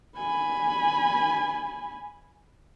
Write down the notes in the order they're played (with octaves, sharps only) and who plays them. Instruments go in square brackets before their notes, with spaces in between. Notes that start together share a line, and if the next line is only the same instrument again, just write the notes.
[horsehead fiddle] G#5 B5